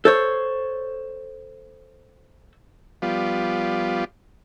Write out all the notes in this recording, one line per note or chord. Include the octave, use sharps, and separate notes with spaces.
A4 C5 C#5
F3 G3 B3 F4 D5